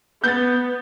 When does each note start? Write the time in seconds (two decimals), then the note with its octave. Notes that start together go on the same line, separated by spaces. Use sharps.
0.24 B3 G6 A6